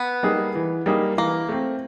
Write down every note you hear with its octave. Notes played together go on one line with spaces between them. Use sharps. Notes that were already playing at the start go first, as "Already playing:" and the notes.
Already playing: B3
G3 A#3 D#4 G#4
E3
G3 A#3 D#4 G#4
E3 A#3
A3 C4